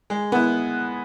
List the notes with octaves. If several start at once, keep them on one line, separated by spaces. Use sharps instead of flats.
G#3
B3 E4